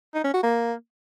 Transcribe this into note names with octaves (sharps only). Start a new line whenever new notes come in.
D#4
C#4
F#4
A#3